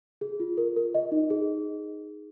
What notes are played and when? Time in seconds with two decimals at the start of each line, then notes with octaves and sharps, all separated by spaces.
0.21 G#4
0.40 F4
0.57 A#4
0.76 A#4
0.94 D#5
1.12 D#4
1.30 G#4